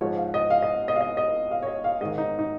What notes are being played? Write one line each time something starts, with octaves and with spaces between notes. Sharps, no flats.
G#2 F3 C#5
F5
D#5
F5
D#5
D#5
F5
D#5
D#5
F5
C#5
D#5
F5
G#2 D#3 D#5
D#4
D#4